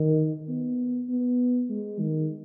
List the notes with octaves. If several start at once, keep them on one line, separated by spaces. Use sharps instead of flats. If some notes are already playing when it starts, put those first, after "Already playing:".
Already playing: D#3
B3
B3
G#3
D#3